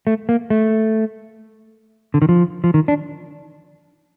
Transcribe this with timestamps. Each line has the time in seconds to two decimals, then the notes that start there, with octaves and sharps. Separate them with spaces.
0.07 A3
0.29 A#3
0.50 A3
2.14 D3
2.22 D#3
2.29 F3
2.64 F3
2.74 D#3
2.88 D4